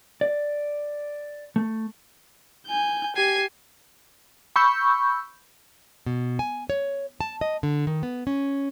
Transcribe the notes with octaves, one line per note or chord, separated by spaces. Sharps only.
D5
A3
G#5 G6
G4 G#5 C7
B5 C#6 E6 G6
B2
G#5
C#5
A5
D#5
D3
D#3
B3
C#4